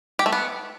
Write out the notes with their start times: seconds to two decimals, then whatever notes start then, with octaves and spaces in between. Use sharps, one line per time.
0.19 G4
0.26 A3
0.33 B3